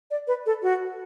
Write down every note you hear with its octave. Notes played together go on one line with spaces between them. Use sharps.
D5
B4
A4
F#4